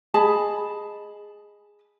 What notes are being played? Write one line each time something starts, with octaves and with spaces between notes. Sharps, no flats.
G#4 D#5 A5 B5